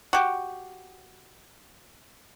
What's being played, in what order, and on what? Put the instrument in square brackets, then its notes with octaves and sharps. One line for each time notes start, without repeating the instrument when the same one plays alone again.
[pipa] F#4 G4